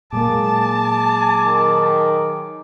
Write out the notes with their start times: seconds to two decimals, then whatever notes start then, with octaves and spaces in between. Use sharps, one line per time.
0.13 A#2 F#3 G#3 A#3 G#4 A5 D6
1.45 D#3